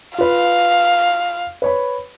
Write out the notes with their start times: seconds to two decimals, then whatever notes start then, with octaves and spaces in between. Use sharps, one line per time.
0.18 F4 B4 F5
1.62 B4 C#5 B5